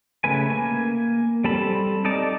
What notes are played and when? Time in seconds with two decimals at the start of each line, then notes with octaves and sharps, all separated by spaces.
0.24 C#3 A3 B4 G#5
0.49 A#3 G#5
1.44 G3 C4 A4 A5 B5
2.05 D#4 A4 D5 A5